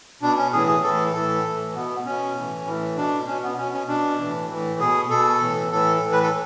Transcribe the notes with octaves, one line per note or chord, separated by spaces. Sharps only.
B2 D4
C#4
A2 E3 G#4
G#4
A2 E3 A4
A2 E3 A4
A2 E3
B2 B3
B2 C#4
A2 E3
A2 E3
B2 D4
B2 C#4
B3
B2 C#4
C#4
B2 D4
A2 E3
A2 E3
B2 G#4
B2 A4
A2 E3
A2 E3 A4
A2 E3
B4
A4